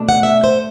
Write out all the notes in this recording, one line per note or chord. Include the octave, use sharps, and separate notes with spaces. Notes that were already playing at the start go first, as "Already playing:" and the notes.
Already playing: B2 A3 D4
F#5
E5
C5